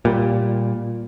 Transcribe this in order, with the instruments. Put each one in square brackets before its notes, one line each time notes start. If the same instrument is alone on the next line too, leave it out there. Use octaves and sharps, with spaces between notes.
[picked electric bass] A#2 G3